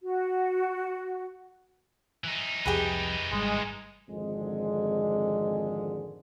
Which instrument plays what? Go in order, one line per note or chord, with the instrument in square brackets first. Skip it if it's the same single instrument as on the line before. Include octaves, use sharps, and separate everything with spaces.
[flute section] F#4
[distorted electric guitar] E3 D#4
[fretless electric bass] C2 F2 [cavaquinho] G4 G#4 B4
[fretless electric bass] G#1 C3 G3 [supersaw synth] G#3
[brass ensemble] G#1 F2 D3 G#3